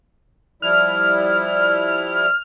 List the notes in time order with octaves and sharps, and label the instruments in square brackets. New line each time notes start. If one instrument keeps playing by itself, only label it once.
[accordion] F3 G3 E4 [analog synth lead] F6